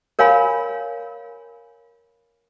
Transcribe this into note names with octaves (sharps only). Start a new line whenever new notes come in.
A#4 C#5 F5 G#5 B5